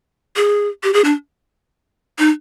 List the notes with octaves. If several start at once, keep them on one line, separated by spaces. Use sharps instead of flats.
G#4
G4
G#4
D4
D#4